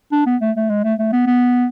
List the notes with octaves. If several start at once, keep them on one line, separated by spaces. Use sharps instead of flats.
D4
B3
A3
A3
G#3
A3
A3
B3
B3